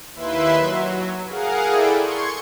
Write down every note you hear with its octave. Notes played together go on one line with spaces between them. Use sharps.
D#2 E4 B4 E5 C6
F#3
G#4 A#4 F5 F#5
E4 G#4 A4 D5 G5 D7
C6 C#6 G#6 C#7